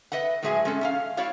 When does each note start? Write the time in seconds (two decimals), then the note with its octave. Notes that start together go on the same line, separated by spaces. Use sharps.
0.12 B4 D#5 E5 F#5
0.43 A2 F#3 G#3 G#4 E5 G#5
0.65 G#3 C#4 A4
0.81 C#4 D4 F5
1.17 E4 F#4 C#5 D5 F5